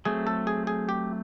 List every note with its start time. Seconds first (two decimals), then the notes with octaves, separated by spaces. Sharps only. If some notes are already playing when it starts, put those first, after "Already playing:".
0.05 F#3 A3 C4 G#4
0.27 A4
0.47 G#4
0.67 G#4
0.89 G4